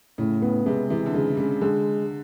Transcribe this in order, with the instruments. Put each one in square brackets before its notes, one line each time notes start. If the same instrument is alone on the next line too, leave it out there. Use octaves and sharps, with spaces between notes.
[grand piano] A2 [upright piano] C#3
[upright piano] C#3 [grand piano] B3
[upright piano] C3 [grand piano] G#3
[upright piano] C3 [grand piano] E3
[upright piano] D3
[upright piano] C#3 [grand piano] G#3
[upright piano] C#3 [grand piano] G#3
[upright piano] D3 [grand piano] G#3